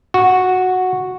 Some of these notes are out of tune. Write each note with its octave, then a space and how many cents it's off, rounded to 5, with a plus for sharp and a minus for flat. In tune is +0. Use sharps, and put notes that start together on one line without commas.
F#4 -5